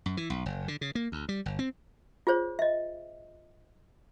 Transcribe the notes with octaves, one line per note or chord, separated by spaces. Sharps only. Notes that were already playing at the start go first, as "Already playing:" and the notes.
F#2
E3
B1
F#1
D3
C#3
A#3
D2
G3
G1
C4
F4 G#4 C5 C#5
D#5 E5